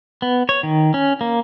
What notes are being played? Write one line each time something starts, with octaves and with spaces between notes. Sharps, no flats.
B3
C#5
D#3
C#4
A#3